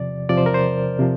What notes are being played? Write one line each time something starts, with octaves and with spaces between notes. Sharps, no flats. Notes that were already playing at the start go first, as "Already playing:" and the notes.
Already playing: E2 C3 F3 D5
E2 C3 F3 D5
C5
A#4
C5
C3 F3